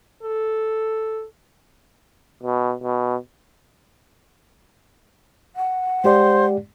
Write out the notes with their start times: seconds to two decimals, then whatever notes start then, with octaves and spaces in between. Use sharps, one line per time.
0.23 A4
2.43 B2
2.83 B2
5.56 F#5
6.04 G#3 G4 C5 D5